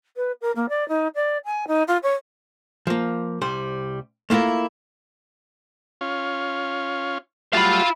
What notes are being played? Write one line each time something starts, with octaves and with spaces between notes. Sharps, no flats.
B4
A#4
A#3
D5
D#4
D5
G#5
D#4
F4
C#5
F3 A#3
C2 G3 C5
A3 A#3 E4 F4 A#4
C#4 F4
F#3 G3 A3 F4 E5 F5 B5